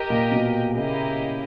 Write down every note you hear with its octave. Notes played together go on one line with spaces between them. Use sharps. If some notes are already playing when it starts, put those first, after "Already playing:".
Already playing: G4 A#4 D#5
A#2
B2
C#3 A#3 E4 G4 A#4 D#5